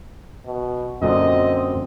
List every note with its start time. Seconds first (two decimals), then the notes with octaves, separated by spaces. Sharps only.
0.45 B2
1.02 F#2 A#2 D3 C4 D#5